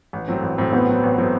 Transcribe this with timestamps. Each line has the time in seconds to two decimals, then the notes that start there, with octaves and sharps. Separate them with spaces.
0.13 A1
0.28 A2 F#3 C4
0.43 A1
0.58 A2 F#3 C4
0.73 A1 B3
0.88 A2 F#3 C4
1.03 A1
1.18 A2 F#3 C4